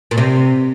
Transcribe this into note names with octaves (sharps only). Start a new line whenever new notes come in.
A#2
C3